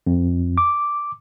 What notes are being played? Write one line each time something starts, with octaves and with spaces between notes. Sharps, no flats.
F2
D6